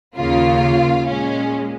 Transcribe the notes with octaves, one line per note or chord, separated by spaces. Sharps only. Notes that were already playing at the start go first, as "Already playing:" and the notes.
D#2 C#3 A#3 F4
A#2 G#3 C#4